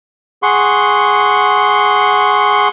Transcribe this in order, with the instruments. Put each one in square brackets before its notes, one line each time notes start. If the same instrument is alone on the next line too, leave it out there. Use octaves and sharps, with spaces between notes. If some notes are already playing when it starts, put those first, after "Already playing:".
[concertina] G#4 F#5 C6 C#6